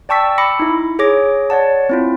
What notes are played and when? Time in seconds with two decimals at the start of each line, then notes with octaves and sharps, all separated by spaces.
0.09 D5 G5 A5 C#6 E6 B6
0.38 B5 D6 E6 A#6 C#7
0.60 D#4 E4
0.99 G#4 C#5 D6 A#6
1.50 C#5 D5 F#5 A5
1.89 C4 E4 F4